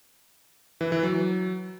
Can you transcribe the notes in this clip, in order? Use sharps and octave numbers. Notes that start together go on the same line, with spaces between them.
E3
E3
F#3